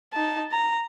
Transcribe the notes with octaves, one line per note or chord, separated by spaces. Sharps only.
D#4 A5
A#5